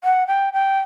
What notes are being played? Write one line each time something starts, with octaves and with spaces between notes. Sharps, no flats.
F#5
G5
G5